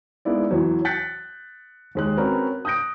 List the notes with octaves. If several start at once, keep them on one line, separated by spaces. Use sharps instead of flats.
G#3 A#3 B3 D#4 E4 D5
E2 E3 F#3
F#6 G6 A6 B6 C#7
D#2 G#3 F#6
C4 C#4 F#4 A#4 B4
D#6 F#6 G6 A#6 D7